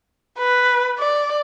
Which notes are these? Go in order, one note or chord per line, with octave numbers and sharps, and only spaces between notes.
B4
D5